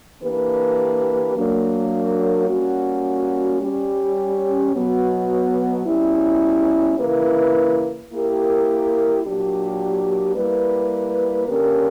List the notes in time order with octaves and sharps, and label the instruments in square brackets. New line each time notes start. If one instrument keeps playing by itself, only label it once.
[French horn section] E3 A#3 D4 G4 B4
F#3 A#3 D4
G3 A#3 C#4 F#4
G3 C#4 G4
B2 F#3 B3
B2 G3 C#4 E4
C#3 E3 A#3 E4 B4
A#3 E4 G4 A#4
A#2 F#3 A#3 D4 G4
G3 A#3 E4 B4
D3 A#3 C#4 G4 A#4